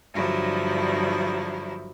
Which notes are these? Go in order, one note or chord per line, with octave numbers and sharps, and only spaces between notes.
G2 D3 F3 F#3 E4